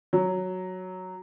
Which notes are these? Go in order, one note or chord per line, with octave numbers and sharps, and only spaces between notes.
F#3